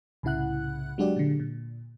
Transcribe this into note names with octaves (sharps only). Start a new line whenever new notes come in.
C2 A2 C#3 E4 F#5 F#6
F#3 G#3 D4 F#4 G4 D5
A#2 D3
A#2